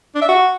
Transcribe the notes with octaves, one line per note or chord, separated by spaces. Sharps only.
D4
E5
F#4